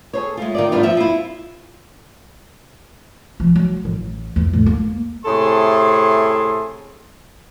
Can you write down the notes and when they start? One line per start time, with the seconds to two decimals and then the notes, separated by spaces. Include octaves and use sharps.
0.13 G#4 A4 C5 C#5
0.37 G#3 A3 F4
0.55 D#3 F4 D5
0.72 A2 G3 B3 D4 D#4 F4
0.83 G2 F3 E5
0.97 E4 F4
3.40 F3
3.56 F#3
3.85 A1
4.36 E2
4.53 A2
4.66 A#3
5.25 A2 C3 G#4 A4 C6